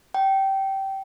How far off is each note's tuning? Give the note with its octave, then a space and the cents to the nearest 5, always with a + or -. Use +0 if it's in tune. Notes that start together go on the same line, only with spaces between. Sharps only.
G5 -15